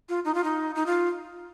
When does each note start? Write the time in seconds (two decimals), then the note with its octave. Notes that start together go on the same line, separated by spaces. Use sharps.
0.09 F4
0.25 D#4
0.34 F4
0.44 D#4
0.75 D#4
0.86 F4